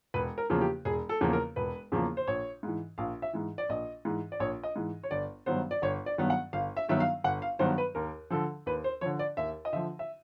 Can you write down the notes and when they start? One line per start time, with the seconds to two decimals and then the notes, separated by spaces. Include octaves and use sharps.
0.14 E1 B4
0.38 A#4
0.50 E2 C#3 F3 A#3
0.61 G4
0.85 E1 G#4
1.09 A4
1.21 E2 C#3 F3 A#3
1.33 A#4
1.56 E1 B4
1.92 E2 C#3 F3 A#3
2.17 C5
2.27 A#1 C#5
2.63 G#2 E3
2.98 A#1 F5
3.22 E5
3.33 G#2 E3
3.58 D5
3.69 A#1 D#5
4.05 G#2 E3
4.32 D5
4.40 A#1 C#5
4.63 D#5
4.76 G#2 E3
5.03 C#5
5.11 G1 D5
5.46 G2 D#3 F#3 B3 C5
5.71 D5
5.82 G1 C#5
6.06 D5
6.18 G2 D#3 F#3 B3
6.30 F#5
6.53 G1 F5
6.77 E5
6.89 G2 D#3 F#3 B3 E5
7.00 F5
7.24 G1 F#5
7.42 F5
7.59 G2 D#3 F#3 B3 C5
7.78 B4
7.95 D#2 A#4
8.30 D3 F3 A4
8.66 D#2 B4
8.84 C5
9.01 D3 F3 C#5
9.19 D5
9.37 D#2 E5
9.65 D#5
9.73 D3 F3 E5
9.99 E5